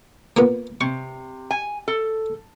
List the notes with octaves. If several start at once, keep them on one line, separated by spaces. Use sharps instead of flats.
A#3 B3 F4
C3 C#6
G#5
A4